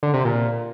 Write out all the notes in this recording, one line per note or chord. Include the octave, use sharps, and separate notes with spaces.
D3
C3
A#2